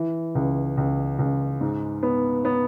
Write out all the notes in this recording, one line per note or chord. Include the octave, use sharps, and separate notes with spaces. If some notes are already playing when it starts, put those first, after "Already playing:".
Already playing: E3
C#2
C#2
C#2
G#2
B3
B3